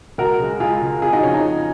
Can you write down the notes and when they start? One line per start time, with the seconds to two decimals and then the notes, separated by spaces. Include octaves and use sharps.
0.18 C#2 F#4 A#4
0.39 C#3 G#3
0.60 C#2 F4 G#4
0.81 C#3 G#3
1.02 F2 F4 G#4
1.13 D#4 F#4
1.23 C#3 F3 C#4 F4
1.34 D#4
1.44 F2